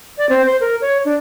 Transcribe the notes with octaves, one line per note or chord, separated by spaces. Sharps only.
D5
C4
C5
A#4
C#5
D4